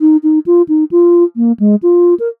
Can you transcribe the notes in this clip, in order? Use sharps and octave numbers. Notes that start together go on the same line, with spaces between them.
D#4
D#4
F4
D#4
F4
A#3
G#3
F4
A#4